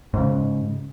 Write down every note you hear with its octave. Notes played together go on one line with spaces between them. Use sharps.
G#2 C#3